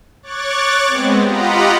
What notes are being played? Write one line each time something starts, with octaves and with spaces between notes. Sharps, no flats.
C#5 C#6 D6 F#6 A6
G#3 B3 C4
F4 G4 D#5 F#5 A#5 B5